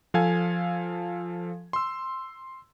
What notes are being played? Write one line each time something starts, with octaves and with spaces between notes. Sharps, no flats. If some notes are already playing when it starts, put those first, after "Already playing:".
F3 A4 F5 G#5 G#6
C6 E6